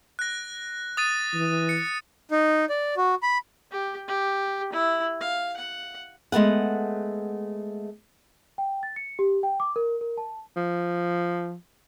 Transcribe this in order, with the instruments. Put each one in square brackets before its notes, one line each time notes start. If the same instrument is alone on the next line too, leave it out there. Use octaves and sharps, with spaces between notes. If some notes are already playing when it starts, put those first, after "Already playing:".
[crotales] F#6 A#6
D#6 A6 D#7
[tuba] E3
[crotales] C#7
[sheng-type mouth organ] D#4
D5
F#4
B5
[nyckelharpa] G4
G4
E4
F5
F#5
[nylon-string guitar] G#3 A3 B3 F#5
[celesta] G5
A6
C#7
G4
G5
D6
A#4
A#4
A5
[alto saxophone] F3